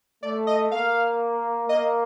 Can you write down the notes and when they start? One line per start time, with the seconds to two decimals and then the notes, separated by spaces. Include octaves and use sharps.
0.23 A3 D5
0.47 D#5
0.71 A#3 F5
1.69 A#3 D#5